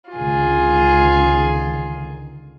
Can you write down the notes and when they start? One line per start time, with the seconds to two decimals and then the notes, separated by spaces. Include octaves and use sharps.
0.11 C#2 D3 D#3 F4 G#4